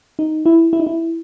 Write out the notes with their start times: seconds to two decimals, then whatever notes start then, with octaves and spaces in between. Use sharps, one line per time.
0.19 D#4
0.46 E4
0.73 E4
0.80 D#4
0.87 E4